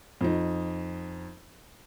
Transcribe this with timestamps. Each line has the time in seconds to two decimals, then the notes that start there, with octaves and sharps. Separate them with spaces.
0.21 F2 D#4